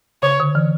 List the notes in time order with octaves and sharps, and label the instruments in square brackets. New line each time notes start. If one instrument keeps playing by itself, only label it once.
[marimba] C#3 [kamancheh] C#5
[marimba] D3
E3